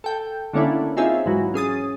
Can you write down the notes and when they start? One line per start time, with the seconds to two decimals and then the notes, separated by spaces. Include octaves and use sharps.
0.04 A4 G5
0.53 D3 A3 A#3 C#4 D4 E4
0.97 C4 D#4 F4 G#4 C#5 E5
1.26 G#2 E3 F#3
1.54 C#4 G#4 D#6 A6